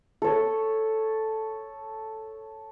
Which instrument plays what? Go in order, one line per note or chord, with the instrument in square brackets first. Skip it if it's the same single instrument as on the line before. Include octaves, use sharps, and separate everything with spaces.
[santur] A4 C#5